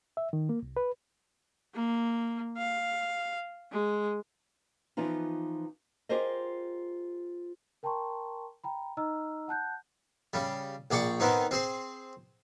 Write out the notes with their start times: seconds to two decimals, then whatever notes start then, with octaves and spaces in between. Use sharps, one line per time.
0.17 E5
0.33 D#3
0.49 A#3
0.63 C2
0.77 B4
1.75 A#3
2.58 F5
3.72 G#3
4.97 E3 F3 B3 D#4 F4
6.09 F4 G4 G#4 A#4 C5 D#5
7.83 A#4 G5 A5 A#5 C6 C#6
8.64 G5 A#5 B5
8.97 D#4 D#5 A#5 E6 F6
9.48 F#5 A5 F#6 G6
10.34 C#3 G3
10.91 A#1 G#4 D5 G5 C#6 D6
11.20 D#3 B3 C4 D#4
11.51 C4 G#4 C5